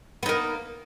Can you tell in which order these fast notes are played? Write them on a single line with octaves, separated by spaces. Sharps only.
B3 D#4 A#3